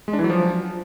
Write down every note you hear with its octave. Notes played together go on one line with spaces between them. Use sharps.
G#3
D4
E3
F#3
F3